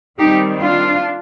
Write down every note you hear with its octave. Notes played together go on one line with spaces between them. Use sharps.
D#3 G3 C4 D#4 G4
D4 F4